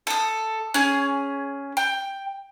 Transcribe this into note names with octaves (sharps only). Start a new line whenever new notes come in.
A4 D#6
C#4 G#4
G5